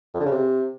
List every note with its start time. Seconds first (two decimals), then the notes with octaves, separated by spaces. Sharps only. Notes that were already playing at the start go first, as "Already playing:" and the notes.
0.14 F2
0.20 D3
0.26 C#3
0.32 C3